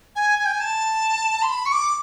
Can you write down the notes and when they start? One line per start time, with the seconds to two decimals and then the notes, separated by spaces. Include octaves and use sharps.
0.16 G#5
0.39 G#5
0.46 G5
0.53 G#5
0.60 A5
1.42 C6
1.49 B5
1.66 C#6
1.72 D6